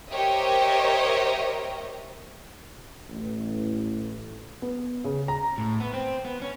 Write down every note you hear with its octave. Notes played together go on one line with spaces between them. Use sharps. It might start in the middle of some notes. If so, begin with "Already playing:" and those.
G4 A#4 C5 C#5 D#5 E5
A1
B3
C#3
A#5
A2
B3
C4
B3
C#4